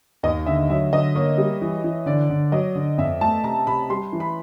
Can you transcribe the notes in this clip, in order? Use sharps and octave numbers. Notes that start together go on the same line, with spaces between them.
D#2 D#5
D3 E5
F#3 E5
D3 D#5
A#3 C#5
G3
E3
E3
D3 D5
D3
F#3 D#5
D3
F2 E5
A3 A5
C3 A#5
C3 B5
G3 C6
E3
B5